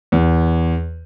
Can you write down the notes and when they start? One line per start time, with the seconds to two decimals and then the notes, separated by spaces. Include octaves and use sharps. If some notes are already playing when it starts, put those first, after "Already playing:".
0.12 E2